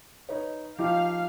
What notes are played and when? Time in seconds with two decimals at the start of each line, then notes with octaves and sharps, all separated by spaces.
0.29 D#4 B4 C#5
0.78 F3 D#4 G4 F5